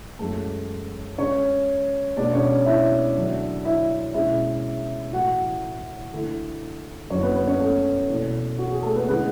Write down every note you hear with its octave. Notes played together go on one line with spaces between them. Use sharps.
F#2 E3 G#3 A3 A4
C#3 G#3 C#4 C#5
B2 G#3 B3 D4 D5
C#4 C#5
E4 E5
E2 D3 F#3 A3 D4
E4 E5
B2 G#3 C#4 E4 E5
A2 E3 A3 F#4 F#5
D3 A3 E4
F#2 D3 F#3 C#4 E4 C#5
B3 B4
B3 B4
C#4 C#5
A3 A4
E2 B2 A3
F#4
G#4
A3 A4
B3 B4
D3 G#3 B3 C#4 E4 B4